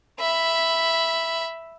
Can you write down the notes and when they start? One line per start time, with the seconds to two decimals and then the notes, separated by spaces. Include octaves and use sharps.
0.20 E5 B5